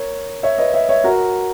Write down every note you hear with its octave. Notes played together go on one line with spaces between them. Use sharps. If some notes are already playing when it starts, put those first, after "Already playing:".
Already playing: A#4 C#5
C#5 E5
B4 D#5
C#5 E5
C#5 E5
F#4 A#4